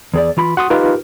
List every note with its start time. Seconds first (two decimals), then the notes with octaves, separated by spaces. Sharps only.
0.14 E2 G#4 D5
0.37 E3 F4 B5
0.57 F#4 F#5 C6 D#6
0.70 D#4 F4 G4 A#4 B4